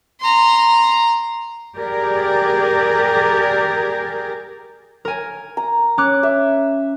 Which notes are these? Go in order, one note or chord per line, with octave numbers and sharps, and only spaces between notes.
A#5 C6
G4 G#4 A#4 D5
A#4 G#5
A#5
C#4 D6 F#6
E5